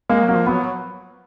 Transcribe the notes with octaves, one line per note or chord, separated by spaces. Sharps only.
G#3 A#3
F#3
A#3
F3
F#3 B3